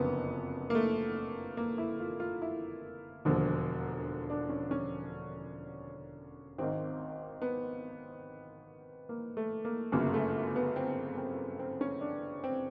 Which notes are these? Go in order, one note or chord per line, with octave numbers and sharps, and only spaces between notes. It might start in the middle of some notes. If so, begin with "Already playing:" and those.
Already playing: F#1 F2 D3 B3
A#3
A3
A#3
E4
F4
F4
E4
E1 D#2 D3 F3
D4
C#4
C#4
G#1 G#2 D#3 C4
B3
A#3
A3
A#3
G1 F#2 C#3 A#3
A3
B3
C4
C4
C4
C#4
D4
C4